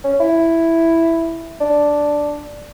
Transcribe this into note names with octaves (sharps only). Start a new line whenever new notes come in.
C#4
E4
D4